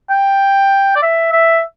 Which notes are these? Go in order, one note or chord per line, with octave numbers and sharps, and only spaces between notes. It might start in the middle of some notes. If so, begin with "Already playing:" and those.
G5
D5
E5
E5